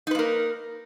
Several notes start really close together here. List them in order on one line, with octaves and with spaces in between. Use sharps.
D#4 B4 A#3 A#4